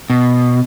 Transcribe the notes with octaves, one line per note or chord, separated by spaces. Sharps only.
B2